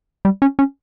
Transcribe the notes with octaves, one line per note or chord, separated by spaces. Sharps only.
G3
C#4
C#4